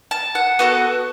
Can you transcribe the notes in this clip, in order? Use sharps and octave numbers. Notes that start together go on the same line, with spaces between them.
A5
F#5
B3 F#4 A4